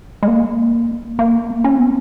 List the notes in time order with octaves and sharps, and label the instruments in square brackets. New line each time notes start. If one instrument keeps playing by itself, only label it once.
[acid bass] G#3
A#3
A#3
C#4
B3